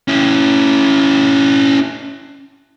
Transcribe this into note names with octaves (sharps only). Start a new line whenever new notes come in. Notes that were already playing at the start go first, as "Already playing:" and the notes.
C#4 E4